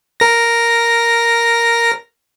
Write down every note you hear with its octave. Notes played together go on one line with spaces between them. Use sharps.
A#4 A#6